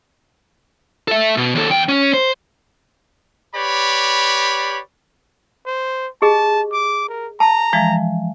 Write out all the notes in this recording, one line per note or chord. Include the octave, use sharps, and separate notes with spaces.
A4 E5
B2
D#2 A4
E2 G5
C#4
C5
G4 B4 C#5 D5 B5
C5
G4 G#4 D#5 A5
D6
A#4
A5 A#5
E3 F3 G#3